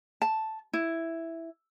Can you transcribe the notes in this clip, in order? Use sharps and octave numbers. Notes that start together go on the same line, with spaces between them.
A5
E4